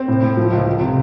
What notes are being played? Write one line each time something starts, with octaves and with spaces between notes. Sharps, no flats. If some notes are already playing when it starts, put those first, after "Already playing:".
Already playing: C4
A2
A2
F3
C#2
F3
C3